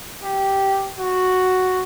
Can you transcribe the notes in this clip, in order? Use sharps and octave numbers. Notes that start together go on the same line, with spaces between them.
G4
F#4